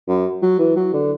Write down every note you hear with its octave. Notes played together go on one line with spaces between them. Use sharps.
F#2
F#3
E3
F#3
D3